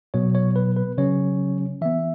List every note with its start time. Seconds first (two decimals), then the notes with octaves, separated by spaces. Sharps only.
0.14 B2 F#3 B3 C#5
0.35 C#5
0.56 B4
0.76 B4
0.98 C#3 F#3 C#4 C#5
1.81 E3 B3 E5